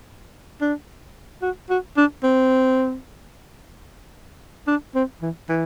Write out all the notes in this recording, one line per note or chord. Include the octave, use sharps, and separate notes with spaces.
D4
F#4
F#4
D4
C4
D4
C4
E3
E3